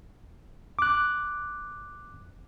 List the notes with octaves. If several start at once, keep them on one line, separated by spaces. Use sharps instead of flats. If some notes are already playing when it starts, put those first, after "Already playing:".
D6 F#6